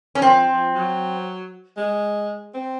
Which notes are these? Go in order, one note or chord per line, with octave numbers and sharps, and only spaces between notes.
C#4
F3 C4
F3
F#3
G#3
C4